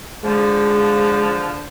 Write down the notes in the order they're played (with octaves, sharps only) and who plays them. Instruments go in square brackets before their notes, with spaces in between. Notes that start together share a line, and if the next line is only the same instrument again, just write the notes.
[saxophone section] D3 F3 [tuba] G#3